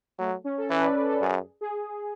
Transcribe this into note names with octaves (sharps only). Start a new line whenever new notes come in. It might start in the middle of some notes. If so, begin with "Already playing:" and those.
F#3 A3
C#4
A4
E3 B4
D5
B4
A4
F#2 G#4
G#4